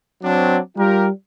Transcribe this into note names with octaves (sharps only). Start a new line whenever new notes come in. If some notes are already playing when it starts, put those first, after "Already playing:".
F#3 C4 D4
G3 F4 G4 A#4